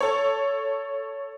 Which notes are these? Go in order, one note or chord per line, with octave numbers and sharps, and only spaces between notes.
A4 C#5